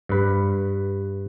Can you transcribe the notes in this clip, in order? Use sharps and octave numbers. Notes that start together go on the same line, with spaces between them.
G2 B4